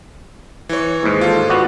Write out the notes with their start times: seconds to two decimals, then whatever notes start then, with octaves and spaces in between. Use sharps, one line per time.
0.69 E3 C#5
1.03 D#2 G#2
1.21 F4 A4
1.49 B3 F#4 D5